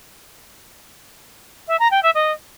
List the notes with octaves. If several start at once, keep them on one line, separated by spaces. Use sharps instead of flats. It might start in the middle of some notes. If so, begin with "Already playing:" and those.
E5
A#5
G5
E5
D#5